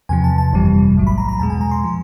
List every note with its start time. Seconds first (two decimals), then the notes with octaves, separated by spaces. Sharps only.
0.09 E2 C3 F3 G#5
0.24 A5
0.38 A5
0.53 G1 F2 C3 E3 G3
0.96 B1 A2 F#3
1.07 B5
1.18 A#5
1.28 A#5
1.39 E2 B2 G#3 A5
1.50 G#5
1.61 A#5
1.71 C6
1.84 F3